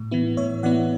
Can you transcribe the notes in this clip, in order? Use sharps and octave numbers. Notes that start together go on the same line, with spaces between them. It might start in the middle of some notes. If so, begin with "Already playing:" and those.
Already playing: A2
E3 B3 E4
A2 C#5 E5
E3 B3 E4 D5 F#5